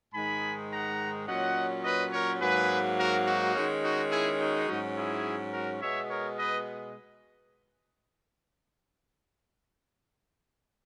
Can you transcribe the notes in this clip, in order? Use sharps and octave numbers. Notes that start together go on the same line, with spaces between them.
G#2 D#3 G#3 D#4 G#5 B5
F#5 A#5
A#2 F#3 C#4 D#5 F#5
B4 D#5
A#4 C#5
G#2 F#3 A#3 G#4 B4
F#4 A#4
D#4 F#4
D#3 G#3 C#4
D#4 F#4
E4 G#4
D#4 F#4
G#2 F#3 C#4
E4 G#4
F#4 A#4
B2 G#3 B3 C#5 E5
A#4 C#5
B4 D#5